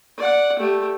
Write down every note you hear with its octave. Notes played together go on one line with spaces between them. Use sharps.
D5 F#5
A3 G4